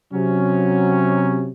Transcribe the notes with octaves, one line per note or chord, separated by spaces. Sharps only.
C3 F#3 C#4